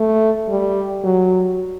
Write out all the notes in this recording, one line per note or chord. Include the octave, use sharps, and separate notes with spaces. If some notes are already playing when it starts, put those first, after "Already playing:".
Already playing: A3
G3
F#3